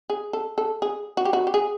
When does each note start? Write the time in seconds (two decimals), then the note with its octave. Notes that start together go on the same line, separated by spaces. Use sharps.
0.10 G#4
0.33 A4
0.58 A4
0.82 G#4
1.17 F#4
1.25 G4
1.33 F#4
1.47 G4
1.54 G#4